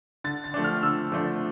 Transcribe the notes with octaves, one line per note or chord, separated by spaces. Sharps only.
D3 A6
A6
F3 A3 D4
F6
D3 E6
F3 A3 D4